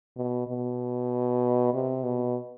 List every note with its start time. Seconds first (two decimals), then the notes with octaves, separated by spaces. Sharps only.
0.17 B2
0.47 B2
1.74 C3
2.04 B2